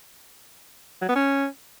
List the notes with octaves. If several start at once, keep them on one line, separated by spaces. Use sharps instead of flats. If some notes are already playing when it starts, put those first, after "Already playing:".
F#3
B3
C#4